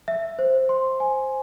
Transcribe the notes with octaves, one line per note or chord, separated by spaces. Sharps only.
E5
C5
C6
G#5